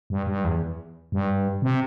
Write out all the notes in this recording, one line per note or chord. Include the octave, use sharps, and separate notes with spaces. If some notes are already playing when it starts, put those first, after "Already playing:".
G2
G2
E2
G2
C3